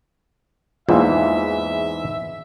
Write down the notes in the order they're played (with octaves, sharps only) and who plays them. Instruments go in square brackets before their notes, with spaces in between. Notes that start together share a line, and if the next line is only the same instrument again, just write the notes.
[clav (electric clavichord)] E2 G#2 E3 [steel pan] A#3 D4 F4 [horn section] E5